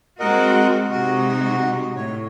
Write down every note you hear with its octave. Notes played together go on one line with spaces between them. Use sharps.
G#3 C4 F#4 A#4 D#5 F#5
C3 G#3 D#4 F#4
A2 C#5